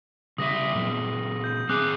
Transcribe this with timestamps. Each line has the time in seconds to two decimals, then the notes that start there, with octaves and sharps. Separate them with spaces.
0.38 C#3 G3 E5 D#6 A#6
0.75 A#2 F#3
1.44 G6
1.69 C4 G#4 D6 D#6 F#6